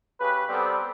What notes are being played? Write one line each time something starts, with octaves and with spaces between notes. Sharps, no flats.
C#3 G4 B4
G3 B3 C4 G4 A4